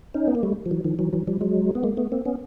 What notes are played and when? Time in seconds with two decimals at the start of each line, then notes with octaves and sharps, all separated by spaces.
0.14 C#4 D#4
0.27 B3
0.35 A#3
0.43 G3 A3
0.66 F3
0.71 E3 F#3
0.84 D#3 F3
0.99 E3 F#3
1.13 E3 F#3
1.27 F3 G3
1.41 F#3 G#3
1.75 B3
1.83 G#3 A#3
1.97 A3 B3
2.12 A#3 C4
2.25 B3 C#4